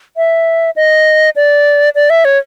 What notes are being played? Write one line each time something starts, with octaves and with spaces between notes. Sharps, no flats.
E5
D#5
D5
D5
E5
C#5